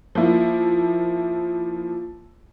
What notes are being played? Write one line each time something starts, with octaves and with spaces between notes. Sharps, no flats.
F3 A#3 E4